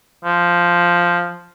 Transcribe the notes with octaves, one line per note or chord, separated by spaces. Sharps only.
F3